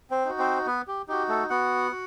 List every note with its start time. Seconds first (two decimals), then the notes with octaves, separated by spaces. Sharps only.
0.11 C4 C5
0.25 D#4 F#4
0.39 C4 C5
0.66 B3 B4
0.88 G4
1.08 D#4 F#4 G4
1.28 A3 A4
1.50 B3 F#4 F#5
1.91 F#4